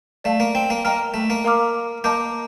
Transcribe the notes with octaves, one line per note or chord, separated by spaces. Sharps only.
A3 D5 F5 A5
A#3
C4
A#3
A#3 D#5 G5 A#5 F6
A3
A#3
A#4 F5 A#5 D6 F6
A#3 D#5 A5 D6 G6